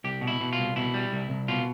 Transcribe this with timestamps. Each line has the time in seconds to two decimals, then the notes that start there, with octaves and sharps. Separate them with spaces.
0.04 C2 G4
0.21 B2
0.27 E4
0.41 B2
0.53 F4
0.59 C2
0.76 B2 E4
0.94 G3
1.13 C2
1.30 C2
1.48 B2 F4